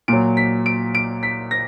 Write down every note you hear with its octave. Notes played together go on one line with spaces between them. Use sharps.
A#2 F#3 D7
B6
D7
D7
B6
A#6